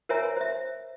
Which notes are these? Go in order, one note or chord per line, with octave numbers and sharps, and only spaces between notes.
A#4 C5 C#5 E5 G#5 A#5
C5 E5